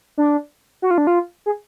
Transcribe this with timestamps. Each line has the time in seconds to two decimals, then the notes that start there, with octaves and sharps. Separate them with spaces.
0.18 D4
0.82 F#4
0.91 F4
0.98 D4
1.07 F4
1.46 G#4